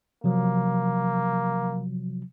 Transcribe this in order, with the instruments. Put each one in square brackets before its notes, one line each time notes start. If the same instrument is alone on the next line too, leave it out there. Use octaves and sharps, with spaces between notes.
[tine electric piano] C3 F3 F#3 [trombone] A#3